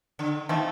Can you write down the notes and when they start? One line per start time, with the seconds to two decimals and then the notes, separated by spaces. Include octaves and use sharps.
0.19 D3
0.49 C3 D#3 F3 A3